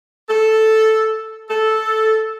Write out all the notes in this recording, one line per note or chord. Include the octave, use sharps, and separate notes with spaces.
A4
A4